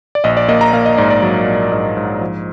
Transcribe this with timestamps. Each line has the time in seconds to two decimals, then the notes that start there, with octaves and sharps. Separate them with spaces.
0.15 D5
0.24 A#1 D#5
0.37 D5
0.49 A#3 D#5
0.61 A#5
0.73 A#3 F5
0.86 D#5
0.98 G#2 D5
1.10 D5
1.22 F#3
1.48 A#1
1.72 G#2 D#5
1.97 G#2
2.21 F3